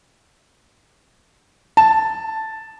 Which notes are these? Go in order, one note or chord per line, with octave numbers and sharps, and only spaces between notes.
A5